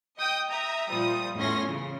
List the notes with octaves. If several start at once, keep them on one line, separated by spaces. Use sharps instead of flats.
D#5 G5 D#6
E5 A#5 D#6
A#2 F3 G3 D#6
E2 A2 C#4 C6 A#6
C#3